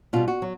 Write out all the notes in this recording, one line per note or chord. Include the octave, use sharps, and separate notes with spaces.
B2 G3 F4
F#4
F#3